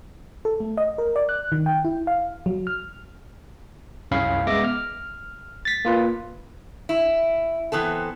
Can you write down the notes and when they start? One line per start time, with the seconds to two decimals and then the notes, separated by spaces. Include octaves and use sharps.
0.45 A4
0.60 A3
0.77 D#5
0.98 A#4
1.16 D5
1.29 F#6
1.52 D#3
1.66 G5
1.85 E4
2.07 F5
2.46 F#3
2.67 F6
4.11 C2 F#2 C#4 F5 B5
4.47 G#3 B3 E5 D6 A#6
4.64 F6
5.65 A6 B6
5.85 A#3 F4 B4
6.89 E4
7.72 E3 B3 C4 A4